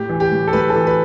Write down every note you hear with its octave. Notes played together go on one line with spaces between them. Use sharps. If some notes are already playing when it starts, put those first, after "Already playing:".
Already playing: A2 G4
E3
G4
A2
A4
A2 B4
A4
E3
B4